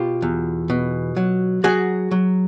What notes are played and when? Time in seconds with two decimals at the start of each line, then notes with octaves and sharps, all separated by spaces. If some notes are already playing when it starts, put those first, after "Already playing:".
Already playing: B2 F4 G4
0.22 E2
0.70 B2
1.17 F#3
1.64 F#3 F#4 G#4
2.11 F#3